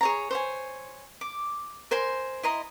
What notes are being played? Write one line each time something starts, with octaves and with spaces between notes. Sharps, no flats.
G#4 C#5 A#5
C5 C#5 G#5
D6
A#4 C5 G#5 C6
E4 D#5 A#5 C6